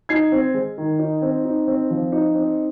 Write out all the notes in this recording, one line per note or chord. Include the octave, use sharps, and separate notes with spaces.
D#4 G#6 C7
C4
G#3
D#3
D#4
C4
D#4
C4
F3
D#4
C4